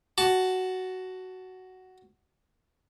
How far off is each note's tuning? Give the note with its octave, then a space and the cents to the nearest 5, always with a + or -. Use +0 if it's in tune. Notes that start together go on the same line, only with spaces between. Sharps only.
F#4 +10 A5 +0